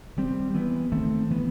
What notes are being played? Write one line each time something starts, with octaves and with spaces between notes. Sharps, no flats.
D#3 G3 C4
E3 B3
D#3 A3 C4
E3 B3